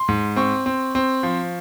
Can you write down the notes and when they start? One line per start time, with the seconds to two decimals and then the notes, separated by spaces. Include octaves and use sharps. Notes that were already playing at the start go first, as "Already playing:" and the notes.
Already playing: C6
0.08 G#2
0.36 C4 C#6
0.66 C4
0.95 C4
1.23 F3